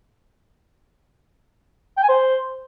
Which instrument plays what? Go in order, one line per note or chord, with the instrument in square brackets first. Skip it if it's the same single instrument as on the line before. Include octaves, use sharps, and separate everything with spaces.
[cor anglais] G5
G#5
C5